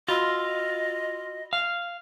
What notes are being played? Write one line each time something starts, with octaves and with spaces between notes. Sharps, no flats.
F4 F#4 D#5 B5 E6
F5